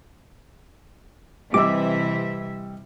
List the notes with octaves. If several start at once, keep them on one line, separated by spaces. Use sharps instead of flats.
C3 E3 G3 D#5 E5 D6 E6